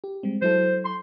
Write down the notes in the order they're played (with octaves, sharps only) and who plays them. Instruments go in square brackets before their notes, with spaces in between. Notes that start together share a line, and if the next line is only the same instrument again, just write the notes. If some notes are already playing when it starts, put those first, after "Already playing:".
[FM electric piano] G4
G3 G#3 C4
[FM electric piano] F#3 E4 A4 [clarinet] C5
[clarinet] C6